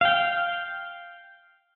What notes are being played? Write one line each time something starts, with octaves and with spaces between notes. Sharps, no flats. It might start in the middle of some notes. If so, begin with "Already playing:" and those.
F5 G5